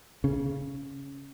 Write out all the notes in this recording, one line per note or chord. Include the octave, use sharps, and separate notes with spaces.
C#3